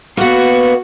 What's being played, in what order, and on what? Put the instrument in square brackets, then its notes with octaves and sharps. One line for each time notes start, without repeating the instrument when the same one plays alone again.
[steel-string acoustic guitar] A#3 B3 [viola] F#4 C#6